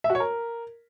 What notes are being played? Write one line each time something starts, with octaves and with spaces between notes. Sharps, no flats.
E5
F#4
C#5
A#4